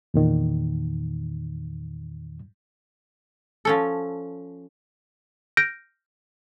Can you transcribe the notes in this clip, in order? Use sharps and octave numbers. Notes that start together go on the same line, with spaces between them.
E2 A#2 D#3
F3 C#4 A4
F6 G6 A#6 D7